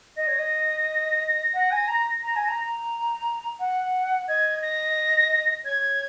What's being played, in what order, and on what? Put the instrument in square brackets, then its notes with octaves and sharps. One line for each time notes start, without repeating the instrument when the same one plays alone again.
[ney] D#5 [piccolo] A#6
[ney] C#5
D#5
F#5
G#5
A#5
A#5
G#5
A#5
F#5
[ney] D#5 [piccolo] G#6
[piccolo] A#6
[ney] C#5 [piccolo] G#6